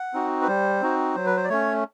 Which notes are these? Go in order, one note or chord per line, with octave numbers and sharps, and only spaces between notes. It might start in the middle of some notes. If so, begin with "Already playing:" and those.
Already playing: F#5
C4 D#4 F#4
B4
G3 C5
C4 D#4 F#4
F#3 C5
B4
C5
D5
A3 C#4 C#5